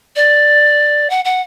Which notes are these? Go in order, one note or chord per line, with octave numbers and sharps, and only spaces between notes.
D5
F#5
F#5